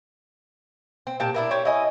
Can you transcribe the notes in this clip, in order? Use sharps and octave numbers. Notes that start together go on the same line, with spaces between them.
C4
A#2 G4 A5
D4 E4 A#4
G4 C5 C#5
E4 D#5 G#5